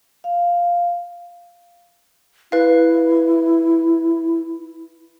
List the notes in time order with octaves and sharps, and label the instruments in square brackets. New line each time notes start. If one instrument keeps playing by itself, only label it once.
[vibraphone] F5
[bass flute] E4 [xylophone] B4 F5